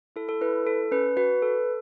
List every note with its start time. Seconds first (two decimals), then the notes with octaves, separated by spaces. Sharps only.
0.16 E4 A4
0.29 A4
0.41 E4 B4
0.67 A4
0.91 C#4 B4
1.17 F#4 B4
1.42 A4